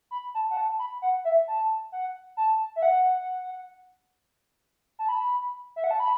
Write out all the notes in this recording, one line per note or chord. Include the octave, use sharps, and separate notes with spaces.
B5
A5
F#5
A5
B5
F#5
E5
A5
F#5
A5
E5
F#5
A5
B5
E5
F#5
A5
B5